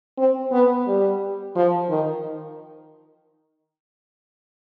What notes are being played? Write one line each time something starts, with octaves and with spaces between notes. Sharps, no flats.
C4
B3
G3
F3
D#3